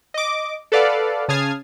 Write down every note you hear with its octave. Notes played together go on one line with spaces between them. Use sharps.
D#5 D6
A4 B4 D5 F5 F#5
C#3 A5 D#6 F6 G#6 C7